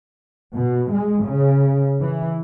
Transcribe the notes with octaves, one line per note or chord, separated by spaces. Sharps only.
B2
G#3
C#3
E3